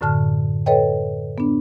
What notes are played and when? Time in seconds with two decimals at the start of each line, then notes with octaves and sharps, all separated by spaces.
0.01 F#2 A2 D3 A5 F6
0.66 A4 B4 C#5 D#5 G5
1.38 B3 D4